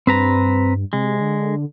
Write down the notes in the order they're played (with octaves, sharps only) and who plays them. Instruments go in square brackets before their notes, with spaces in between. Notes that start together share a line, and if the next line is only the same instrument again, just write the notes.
[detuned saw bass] G2 [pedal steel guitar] C4 B4 A#5
[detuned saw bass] C3 [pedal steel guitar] G#3
[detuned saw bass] D3